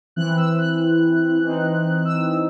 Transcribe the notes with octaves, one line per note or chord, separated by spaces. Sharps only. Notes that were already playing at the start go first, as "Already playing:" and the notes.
E3 C4 E4 F#6
E6
F#6
E3 C4 D#4
E6